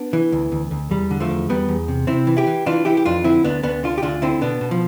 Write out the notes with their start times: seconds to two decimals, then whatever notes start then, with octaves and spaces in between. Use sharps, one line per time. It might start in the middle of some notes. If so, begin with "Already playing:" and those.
Already playing: B3 D4
0.13 E3
0.32 D2
0.52 D2
0.71 D2
0.91 E2 G3
1.11 D3
1.20 F3 A3
1.31 E2
1.49 E2 G3 B3
1.68 E2
1.88 C3
2.07 C3 C4 E4
2.27 E3
2.37 E4 G4
2.47 E3
2.66 E3 D4 F4
2.85 E3 E4 G4
2.97 G4
3.05 F2 D4 F4
3.24 D3 C4 E4
3.44 D2 B3 D4
3.63 D2 B3 D4
3.83 D3 D4 F4
3.98 G4
4.02 D2 D4 F4
4.22 D3 C4 E4
4.41 B2 B3 D4
4.61 B2
4.71 F3